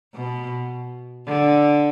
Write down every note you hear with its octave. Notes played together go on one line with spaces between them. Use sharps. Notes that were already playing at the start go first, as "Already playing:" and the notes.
B2
D3